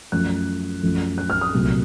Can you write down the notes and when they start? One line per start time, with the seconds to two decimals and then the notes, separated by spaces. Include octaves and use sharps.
0.12 F#2 F3 A3 F#6
0.83 F#2 F3 A3
1.18 F#6
1.30 F6
1.41 D#6
1.54 C2 A#2 F#3 A3